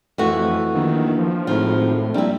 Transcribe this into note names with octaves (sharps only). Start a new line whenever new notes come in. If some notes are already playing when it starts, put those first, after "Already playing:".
F2 E3 A3 F#4
A#1 D#3
F3
G#1 A2 F3
A#1 G3 E4